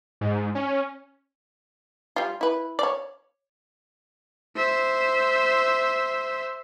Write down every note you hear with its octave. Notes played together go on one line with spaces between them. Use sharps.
G#2
C#4
G3 F4
E4 B4
C#5 D5
C5 E5